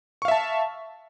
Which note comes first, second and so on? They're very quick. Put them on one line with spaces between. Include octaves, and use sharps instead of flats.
C#6 F5 E5 A5